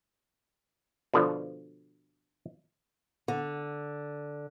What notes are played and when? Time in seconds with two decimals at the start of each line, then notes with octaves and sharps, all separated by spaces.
1.14 B2 D3 F3
3.28 D3